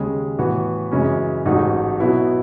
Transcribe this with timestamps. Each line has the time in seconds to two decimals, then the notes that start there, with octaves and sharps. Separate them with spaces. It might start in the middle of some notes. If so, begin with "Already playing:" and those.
Already playing: D#2 C#3 G#3
0.38 A2 E3 B3 F#4
0.91 F#2 C#3 E3 G#3 C#4
1.45 A1 G#2 F#3 A3 D#4
2.00 B2 F#3 B3 E4